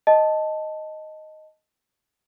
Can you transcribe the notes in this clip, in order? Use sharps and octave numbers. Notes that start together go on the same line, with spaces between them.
D#5 A5